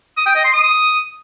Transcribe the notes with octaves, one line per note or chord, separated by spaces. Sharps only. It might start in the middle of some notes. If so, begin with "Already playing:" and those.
D#6
G5
D#5
C6
D#6